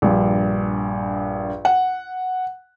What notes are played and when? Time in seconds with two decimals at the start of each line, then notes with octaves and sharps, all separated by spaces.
0.02 A#1 G2
1.65 F#5